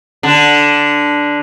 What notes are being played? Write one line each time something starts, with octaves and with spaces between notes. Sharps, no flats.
D3